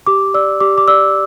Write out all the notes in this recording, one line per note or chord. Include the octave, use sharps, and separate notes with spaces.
G4 D6
D5 E6
G4 D6
D6
D5 E6